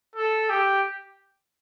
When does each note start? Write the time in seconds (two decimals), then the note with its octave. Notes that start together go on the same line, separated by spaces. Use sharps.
0.16 A4
0.50 G4